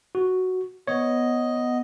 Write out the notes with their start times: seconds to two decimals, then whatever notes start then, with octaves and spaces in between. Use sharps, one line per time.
0.15 F#4
0.87 B3 C#5 D#5